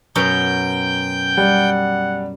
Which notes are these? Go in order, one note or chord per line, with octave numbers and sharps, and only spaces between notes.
F#2 B2 F#3 G5 G6
G3 F#5